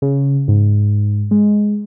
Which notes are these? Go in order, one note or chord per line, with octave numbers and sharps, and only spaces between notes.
C#3
G#2
G#3